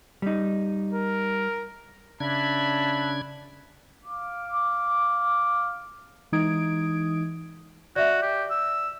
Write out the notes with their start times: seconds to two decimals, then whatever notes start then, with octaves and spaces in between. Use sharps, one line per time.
0.22 G3 D#4
0.93 A#4
2.20 C#3 D4 E5 A5 B5 G#6
4.05 F5 D6
6.32 E3 G#3 D#4 D#6 G#6 D7
7.96 F#4 D5 E5
8.22 G4
8.51 E6